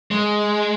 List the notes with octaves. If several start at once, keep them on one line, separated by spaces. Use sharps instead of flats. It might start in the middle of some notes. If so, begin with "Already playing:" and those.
G#3